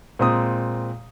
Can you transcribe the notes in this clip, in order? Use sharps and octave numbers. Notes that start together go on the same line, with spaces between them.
A#2 G#3 C4 A#5 D#6